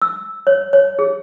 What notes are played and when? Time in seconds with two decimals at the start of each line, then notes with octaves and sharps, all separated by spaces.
0.02 E6
0.47 C#5
0.73 C#5
0.99 G#4